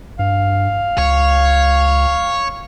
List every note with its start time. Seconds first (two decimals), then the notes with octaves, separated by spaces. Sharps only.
0.19 G2 F5
0.98 C#2 C#5